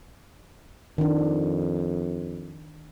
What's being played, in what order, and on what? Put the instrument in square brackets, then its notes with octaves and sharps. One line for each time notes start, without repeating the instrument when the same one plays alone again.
[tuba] F2 [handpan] D#3 D4